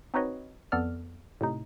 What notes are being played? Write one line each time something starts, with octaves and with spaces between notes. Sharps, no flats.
C4 D#4 F#4 B4 C#5 D#5
F2 B3 A4 D5 F6
A2 C3 D#4